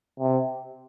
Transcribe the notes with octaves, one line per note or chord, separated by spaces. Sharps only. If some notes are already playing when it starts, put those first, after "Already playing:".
C3